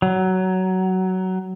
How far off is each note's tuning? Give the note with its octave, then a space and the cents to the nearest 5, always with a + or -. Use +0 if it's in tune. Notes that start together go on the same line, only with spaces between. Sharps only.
F#3 +15